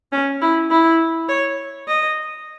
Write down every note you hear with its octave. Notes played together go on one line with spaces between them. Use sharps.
C#4
E4
E4
C#5
D#5